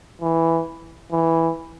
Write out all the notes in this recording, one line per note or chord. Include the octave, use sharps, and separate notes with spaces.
E3
E3